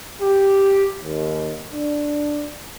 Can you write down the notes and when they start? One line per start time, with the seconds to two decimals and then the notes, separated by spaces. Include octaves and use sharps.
0.22 G4
1.03 D#2
1.72 D4